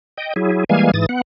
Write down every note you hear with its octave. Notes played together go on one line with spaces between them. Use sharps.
D#5 G5
F#3 E4 G#4
E3 G3 G#3 A#3 F5 G#5
G#2 E3 D#6 A6
B3 F#5